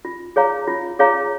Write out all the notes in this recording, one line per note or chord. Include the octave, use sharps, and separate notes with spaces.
F4
G#4 C#5 F5 A#5
F4
G#4 C#5 F5 A#5